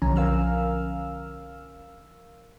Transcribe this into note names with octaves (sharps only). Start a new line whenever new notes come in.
B1 D3 F3 C#4 G#5 A#5
A#4 F5 E6 F6